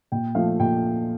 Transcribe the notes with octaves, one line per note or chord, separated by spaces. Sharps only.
A#2 G5
F3 A3 F5
A#2 G5